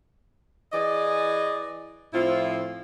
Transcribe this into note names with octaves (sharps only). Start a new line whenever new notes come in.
E3 G#4 D5 D#5
A2 F3 C4 E4 F4